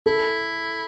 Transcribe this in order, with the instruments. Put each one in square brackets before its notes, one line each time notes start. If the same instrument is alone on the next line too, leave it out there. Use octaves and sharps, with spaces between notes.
[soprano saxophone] E4 [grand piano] A4